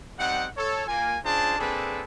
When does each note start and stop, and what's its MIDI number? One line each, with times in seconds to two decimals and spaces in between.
0.19 0.46 55
0.19 0.46 60
0.19 0.46 63
0.19 0.46 78
0.57 0.84 69
0.57 0.84 73
0.87 1.17 58
0.87 1.17 65
0.87 1.17 80
1.25 1.59 61
1.25 1.59 62
1.25 1.59 65
1.25 1.59 68
1.25 1.59 72
1.25 1.59 81
1.59 2.04 58
1.59 2.04 60
1.59 2.04 62
1.59 2.04 68
1.59 2.04 69
1.59 2.04 71